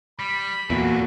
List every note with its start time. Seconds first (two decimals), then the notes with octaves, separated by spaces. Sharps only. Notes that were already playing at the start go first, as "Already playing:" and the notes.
0.19 G3 B5
0.70 E2 A#2 E3 F#3 F#4 A4